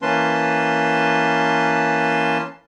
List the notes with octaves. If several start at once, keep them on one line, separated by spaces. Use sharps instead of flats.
E3 A#3 C#4 B4 A5 C6